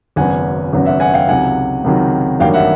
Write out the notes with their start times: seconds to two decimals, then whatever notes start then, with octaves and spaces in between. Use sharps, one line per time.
0.16 G#1 F#2 C#3 F#3 B3 F#5 G#5
0.73 G#1 F#2 C#3 F#3 B3
0.86 E5 F#5
1.00 F#5 G#5
1.14 F5 G5
1.28 C#2 C3 D#3 F#3 F#5 G#5
1.84 C#2 C3 D#3 F#3
2.39 A1 G2 D#3 F#3 A#3 F5 G5
2.54 E5 F#5